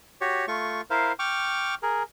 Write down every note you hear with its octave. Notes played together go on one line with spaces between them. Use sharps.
F#4 G4 C#5
A3 F4 C#6
E4 A#4 C5 F5
G5 C#6 D6 F6
G#4 A#4